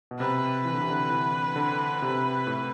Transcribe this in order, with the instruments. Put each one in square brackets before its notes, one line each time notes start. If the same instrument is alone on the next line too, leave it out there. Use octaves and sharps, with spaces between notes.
[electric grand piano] B2
[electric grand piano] C3 [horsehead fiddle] B4
[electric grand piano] E3
D3
C3
D3
E3
D3
C3
A2